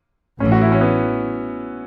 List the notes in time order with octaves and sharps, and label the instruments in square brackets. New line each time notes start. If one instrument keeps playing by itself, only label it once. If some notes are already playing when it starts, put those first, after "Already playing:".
[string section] A1 A2 E3 [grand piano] C#4
[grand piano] F#4
E4
C#4
B3